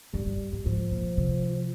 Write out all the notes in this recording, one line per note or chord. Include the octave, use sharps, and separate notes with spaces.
G2 G3
G2
G#2
G#2 F3
A#2
C3